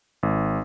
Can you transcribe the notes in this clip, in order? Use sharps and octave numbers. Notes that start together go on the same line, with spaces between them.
G#1